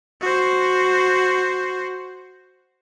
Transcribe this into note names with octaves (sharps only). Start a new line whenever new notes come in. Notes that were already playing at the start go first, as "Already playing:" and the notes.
F#4 C5